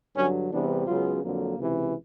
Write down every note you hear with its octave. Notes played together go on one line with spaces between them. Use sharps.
G2 D3 F#3 C#4
E2 C3 E3 G3 B3 D4
C#2 C#3 F#3 B3 F4
F2 D3 F#3 A#3
C#2 C3 E3